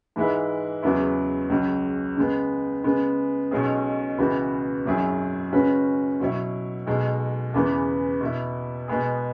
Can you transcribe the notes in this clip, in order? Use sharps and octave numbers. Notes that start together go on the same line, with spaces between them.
G#2 E3 G#3 E4 B4
E2 C#3 F#3 B3 E4
C#2 C#3 F#3
C#3 G#3 B3
C#3 G#3 B3
B1 B2 G#3 C#4 G#4
C#2 C#3 E3 B3 F#4
G#1 F#2 F#3 E4 G#4
C#3 G#3 C#4 F#4 B4
B2 F#3 E4 C#5
B1 B2 G#3
E2 C#3 E3 B3
B2 B3 E4
B2 G#3 B3 G#4